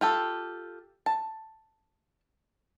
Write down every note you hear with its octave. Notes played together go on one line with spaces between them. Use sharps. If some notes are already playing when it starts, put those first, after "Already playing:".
F4 G4 A4
A5